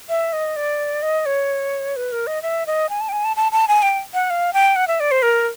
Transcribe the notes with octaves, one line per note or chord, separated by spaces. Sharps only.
E5
D#5
D5
D#5
C#5
B4
A#4
D#5
E5
D#5
G#5
A5
G5
G#5
A5
A5
A5
G#5
G5
F#5
F5
G5
F#5
E5
D5
C5
A#4